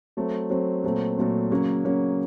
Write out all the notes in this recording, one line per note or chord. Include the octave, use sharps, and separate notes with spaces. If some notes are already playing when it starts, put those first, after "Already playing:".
F#3 A3 C4
F#3 A3 C4
A#2 F#3 A3 C4
A#2 F#3 A3 C4
C#3 F#3 A#3 C#4
C#3 F#3 A#3 C#4